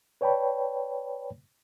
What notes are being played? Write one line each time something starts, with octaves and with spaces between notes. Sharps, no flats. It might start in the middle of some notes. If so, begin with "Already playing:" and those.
B4 C#5 D5 G5 A5 B5